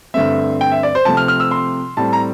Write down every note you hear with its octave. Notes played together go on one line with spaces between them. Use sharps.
G2 D3 A3 C4 E5
G5
E5
D5
C5
C3 F3 A3 C4 A5
F6
F6
E6
C6
A2 G3 C4 A5
A#5